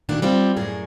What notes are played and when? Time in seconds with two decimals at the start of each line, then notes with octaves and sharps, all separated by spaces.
0.09 A#2 D#3 A3 D4 F#4
0.22 G3 C4 F4
0.56 F#2 A2 C#4 G#4 A#4